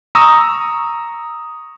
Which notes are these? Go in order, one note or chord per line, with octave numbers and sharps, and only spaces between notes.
A#5 C#6 D#6 E6 A#6